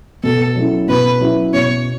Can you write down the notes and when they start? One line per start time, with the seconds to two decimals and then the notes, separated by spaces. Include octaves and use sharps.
0.23 B2 A4
0.56 F#3 C#4 E4
0.88 B2 B4
1.21 F#3 C#4 E4
1.53 B2 C#5